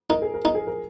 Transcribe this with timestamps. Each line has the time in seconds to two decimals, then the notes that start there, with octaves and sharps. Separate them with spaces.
0.10 D#4 A#4
0.22 G#4
0.34 A#4
0.45 D#4
0.55 G#4
0.67 A#4